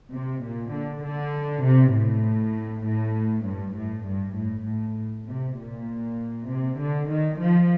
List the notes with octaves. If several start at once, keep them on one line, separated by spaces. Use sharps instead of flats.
C3
A#2
D3
D3
C3
A2
A2
G2
A2
G2
A2
A2
C3
A#2
C3
D3
D#3
F3